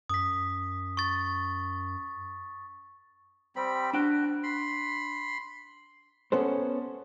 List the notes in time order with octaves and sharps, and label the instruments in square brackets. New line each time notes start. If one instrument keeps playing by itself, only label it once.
[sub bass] F#2 [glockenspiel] D#6 B6
[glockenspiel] C#6 A6
[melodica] G3 C4 B5
[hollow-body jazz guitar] D4 G5 [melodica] F#4
[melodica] B5 C6
[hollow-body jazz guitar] B3 C#4 A4 C5